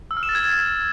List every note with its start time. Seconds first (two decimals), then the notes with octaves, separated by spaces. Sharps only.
0.11 E6
0.17 F6
0.23 E7
0.29 A6
0.35 G#6